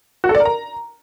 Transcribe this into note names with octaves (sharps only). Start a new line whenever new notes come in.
F#4
A4
D5
A#4
A#5